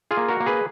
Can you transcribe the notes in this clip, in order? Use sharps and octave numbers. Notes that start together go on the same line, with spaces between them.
F4 G#4
A#3
F#4 A#4
A#3
G#4 B4